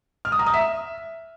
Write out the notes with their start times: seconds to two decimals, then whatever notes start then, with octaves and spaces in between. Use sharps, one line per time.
0.25 F6
0.32 D#6
0.39 A#5
0.46 D#6
0.54 E5